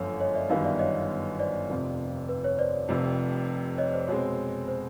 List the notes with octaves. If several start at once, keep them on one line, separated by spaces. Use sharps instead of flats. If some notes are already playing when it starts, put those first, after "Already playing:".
Already playing: G1 F#2 D3 F3 A3 C#5
C#5 D#5
D5 E5
G1 F#2 D#3 G3 B3 D#5 F5
D5 E5
C#5 D#5
C5 D5
F1 F2 C3 F3
B4
C#5
C5 D5
F1 F2 C3
C#5 D#5
C5 D5
B2 G#3 C4 C#5
C5